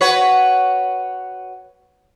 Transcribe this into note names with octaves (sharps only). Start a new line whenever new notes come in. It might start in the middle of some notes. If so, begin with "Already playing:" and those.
F#4 B4 C#5